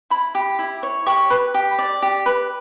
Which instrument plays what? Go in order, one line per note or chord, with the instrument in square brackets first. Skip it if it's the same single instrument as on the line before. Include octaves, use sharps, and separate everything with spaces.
[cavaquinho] E4 B5
G4
E4
C#5
G4 C#6
B4
G4
D5
G4
B4